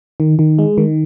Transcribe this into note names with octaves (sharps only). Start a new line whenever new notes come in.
D#3
D#3
G#3
D#3